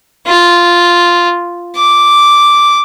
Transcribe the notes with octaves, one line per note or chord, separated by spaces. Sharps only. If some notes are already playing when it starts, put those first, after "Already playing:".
F4
D6